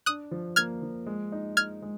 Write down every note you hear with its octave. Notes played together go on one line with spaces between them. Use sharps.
D4 D#6 F#6
F3
A#3 F6 G#6
F3
G#3
D#4
D#4 F6 G#6
G#3